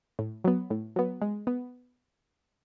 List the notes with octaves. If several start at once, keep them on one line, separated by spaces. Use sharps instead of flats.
A2
F#3 B3
A2
F#3 B3
G#3
B3